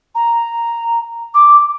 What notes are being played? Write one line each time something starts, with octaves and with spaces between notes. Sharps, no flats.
A#5
D6